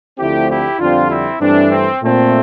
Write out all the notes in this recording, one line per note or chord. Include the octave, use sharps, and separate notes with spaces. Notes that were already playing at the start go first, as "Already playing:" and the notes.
D2 D3 F3 A3 C4 E4 G4
E4 G4
F2 D3 G3 C4 D4 F4
C4 E4
G2 E3 A3 C4 D4
C4
A#2 A3 C4